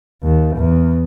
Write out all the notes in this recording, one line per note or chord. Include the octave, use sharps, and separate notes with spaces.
D#2
E2